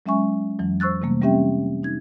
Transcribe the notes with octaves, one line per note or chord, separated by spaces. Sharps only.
F#3 G#3 C#4 E5 G#5 C#6
F2 E3 F#3
C5 C#6 E6 F#6 A6
C3 E3 G3 A3 A#3
G3 C4 C#4 G4 E5 G5
D#4 G#6